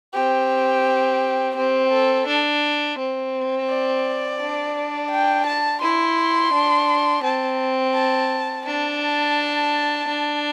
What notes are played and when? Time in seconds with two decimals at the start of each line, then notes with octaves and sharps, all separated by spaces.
0.13 C4 G4
1.56 C4 G4
1.92 A4
2.27 D4
2.98 C4
3.69 D5
4.40 D4
5.11 G5
5.46 A5
5.82 E4 C6
6.53 D4
7.24 C4 A5
7.94 A5
8.66 D4 A5
10.08 D4